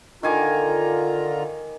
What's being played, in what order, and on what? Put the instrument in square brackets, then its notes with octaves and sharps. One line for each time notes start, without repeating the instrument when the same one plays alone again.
[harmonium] D3 F4 A#5 [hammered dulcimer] D#3 G#5 D6